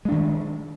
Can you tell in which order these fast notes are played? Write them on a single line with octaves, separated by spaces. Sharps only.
G#3 D4 D#3